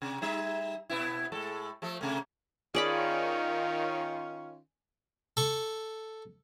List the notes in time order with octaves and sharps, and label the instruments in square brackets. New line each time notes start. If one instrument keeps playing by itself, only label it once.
[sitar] C3
G3 D#4 E5
B2 B3 E4
A2 G#3 A4
F3 A3 A4
C3 A3
[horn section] D#3 C#4 F4 [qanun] G#4 D5 B5
[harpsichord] A4 C#6